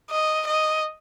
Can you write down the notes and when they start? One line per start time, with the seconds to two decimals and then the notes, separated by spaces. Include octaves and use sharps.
0.10 D#5
0.47 D#5